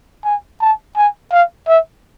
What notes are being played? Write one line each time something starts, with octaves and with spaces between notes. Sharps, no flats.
G#5
A5
G#5
F5
E5